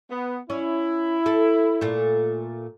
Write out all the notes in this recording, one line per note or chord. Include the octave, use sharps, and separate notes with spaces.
B3
C#4 E4
A4
A#2 A3